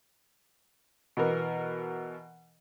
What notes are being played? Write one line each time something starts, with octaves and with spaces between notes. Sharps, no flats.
B2 E3 B3 A#4